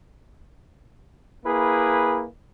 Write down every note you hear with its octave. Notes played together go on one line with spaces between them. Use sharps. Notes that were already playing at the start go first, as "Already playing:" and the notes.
A#3 E4 G#4 B4